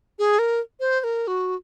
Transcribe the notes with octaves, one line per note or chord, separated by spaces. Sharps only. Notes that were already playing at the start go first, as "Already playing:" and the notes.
G#4
A#4
C5
C5
A#4
F#4